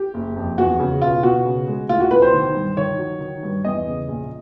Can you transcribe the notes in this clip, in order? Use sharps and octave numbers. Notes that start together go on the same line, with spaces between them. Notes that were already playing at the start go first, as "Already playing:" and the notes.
Already playing: G4
F#1
F2
E2 F#4
C#3
B2 F4
B2 F#4
C#3
G#3
A2 F4
F#4
B1 B4
C5
D#3
G2
D#3 C#5
F#3
D#3
G2
E2 D#5
C#3
A#1